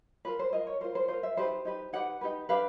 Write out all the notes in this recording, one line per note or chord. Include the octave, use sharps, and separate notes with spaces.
F4 A#4 B4
C5
F4 A#4 D#5
C#5
F4 A#4 C5
C5
F4 A#4 C5
E5
D#4 G4 B4 C5
D#4 G4 B4
D#4 G4 B4 F#5
D#4 G4 B4
D4 G4 B4 F5